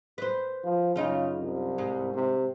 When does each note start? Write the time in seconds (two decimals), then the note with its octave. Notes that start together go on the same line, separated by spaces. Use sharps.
0.18 B4 C5
0.64 F3
0.96 F#2 C#3 D#4 F4
1.37 C2
1.78 G#2
2.14 C3